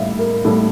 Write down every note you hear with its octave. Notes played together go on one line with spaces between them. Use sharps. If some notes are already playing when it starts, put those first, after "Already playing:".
Already playing: A2 G3 E5 F5
A#4
A2 G3 A4